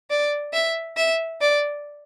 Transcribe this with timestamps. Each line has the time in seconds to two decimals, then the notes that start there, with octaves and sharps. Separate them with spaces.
0.10 D5
0.53 E5
0.97 E5
1.41 D5